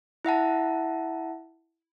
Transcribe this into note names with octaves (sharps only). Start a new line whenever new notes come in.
E4 E5 F#5 A5